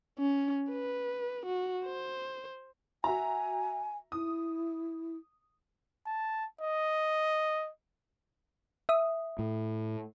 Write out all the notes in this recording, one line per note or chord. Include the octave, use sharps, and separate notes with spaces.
C#4
B4
F#4
C5
F#4 E5 G#5 A#5
E4 D#6
A5
D#5
E5 D#6
A2